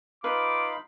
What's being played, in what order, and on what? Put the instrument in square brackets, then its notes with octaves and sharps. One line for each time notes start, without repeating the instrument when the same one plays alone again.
[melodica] D#4 F5 B5 [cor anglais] F4 [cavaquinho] B4 [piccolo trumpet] D6